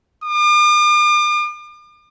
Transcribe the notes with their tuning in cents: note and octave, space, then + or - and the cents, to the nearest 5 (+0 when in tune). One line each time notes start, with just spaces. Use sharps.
D6 +45